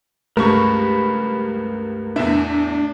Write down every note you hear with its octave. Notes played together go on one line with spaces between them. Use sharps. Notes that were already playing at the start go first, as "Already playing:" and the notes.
C#2 G2 A3 A#4 B4 C#6
E2 A2 D4 E5